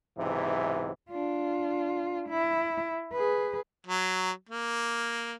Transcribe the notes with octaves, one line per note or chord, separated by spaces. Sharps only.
B1 G#2 C3 E3
D4 F4
E4
G#4 B4
F#3
A#3